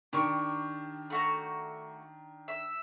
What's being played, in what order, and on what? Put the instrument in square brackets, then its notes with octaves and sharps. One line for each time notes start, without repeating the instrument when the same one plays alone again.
[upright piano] D#3 D4 [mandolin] G4 C#6 D6
[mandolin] A3 F#4 A#5
E5